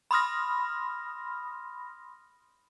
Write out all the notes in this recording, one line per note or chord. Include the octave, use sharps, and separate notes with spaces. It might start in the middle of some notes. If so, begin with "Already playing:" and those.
B5 C6 D#6 F6 A#6